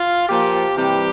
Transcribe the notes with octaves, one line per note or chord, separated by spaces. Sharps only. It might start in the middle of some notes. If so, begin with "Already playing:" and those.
Already playing: F4
A#2 F3 G4
C3 E3 G3 G4